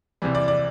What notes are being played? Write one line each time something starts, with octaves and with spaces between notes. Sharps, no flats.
C2 C3 E3 G3
D5
D5